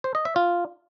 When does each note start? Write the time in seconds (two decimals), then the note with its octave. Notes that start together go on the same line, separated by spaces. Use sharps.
0.04 C5
0.15 D#5
0.25 E5
0.36 F4